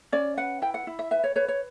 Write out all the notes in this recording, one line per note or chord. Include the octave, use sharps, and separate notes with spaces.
C#4 D5
B4 F#5
E4 G5
F#5
E4
E5
B4 E5
C#5
B4 C#5
C#5